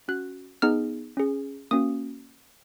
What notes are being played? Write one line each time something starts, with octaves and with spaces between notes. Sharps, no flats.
C#4 F#4 F#6
B3 D#4 G#4 F6
C#4 G#4
A#3 C#4 F#4 D#6